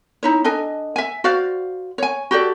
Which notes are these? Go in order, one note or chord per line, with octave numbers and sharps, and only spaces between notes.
D#4 E4 C#5
D4 A4 D#5 G#5
E5 G#5
F#4 C5 D5 F5
C#5 G#5
F#4 G4 A4 D5